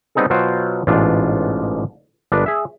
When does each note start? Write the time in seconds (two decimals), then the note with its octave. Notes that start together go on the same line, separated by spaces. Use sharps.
0.15 G3 B3 C4 D#4 G#4 A4
0.30 B2 F#3 F4 F#4 C5 G5
0.87 A1 G#2 B2 D4 F4
2.32 G1 G#3 D4 A#4 B4
2.46 G#4 E5